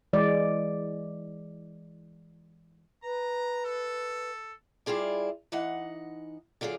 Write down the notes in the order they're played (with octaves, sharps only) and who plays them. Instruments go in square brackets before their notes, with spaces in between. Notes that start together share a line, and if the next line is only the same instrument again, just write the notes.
[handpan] E3 G#3 D5
[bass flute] B4 [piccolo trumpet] A#5
[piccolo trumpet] A4
[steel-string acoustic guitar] G3 E4 F4 G#4 D5
E3 D#4 F#5
D3 F#3 F4 G#4 D5